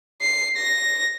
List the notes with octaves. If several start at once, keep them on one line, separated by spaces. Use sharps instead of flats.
C7
A#6